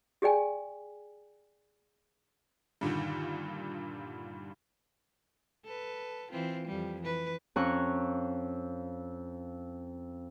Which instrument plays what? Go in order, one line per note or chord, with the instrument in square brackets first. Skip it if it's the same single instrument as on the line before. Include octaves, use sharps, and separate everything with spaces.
[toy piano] G4 G#4 D5 G5 G#5
[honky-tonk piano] G2 A#2 D3 D#3
[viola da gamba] A4 B4
E3 C4 F4
F2 G3
E3 B4
[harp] F2 C#4 C#5 A#5 C#6 F#6